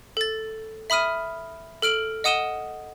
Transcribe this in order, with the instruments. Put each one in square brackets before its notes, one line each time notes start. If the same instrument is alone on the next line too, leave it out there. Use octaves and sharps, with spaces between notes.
[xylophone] A4 A6
E5 B5 D#6 F6 D#7
A4 F6 D7 F#7
D#5 F#5 D#6 D#7 E7 G7